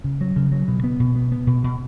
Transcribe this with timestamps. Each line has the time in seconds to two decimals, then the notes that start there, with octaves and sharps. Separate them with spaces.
0.04 C#3
0.21 F#3
0.36 C#3
0.52 F#3
0.68 B2
0.84 B3
1.00 B2
1.16 B3
1.32 B3
1.47 B2
1.64 B2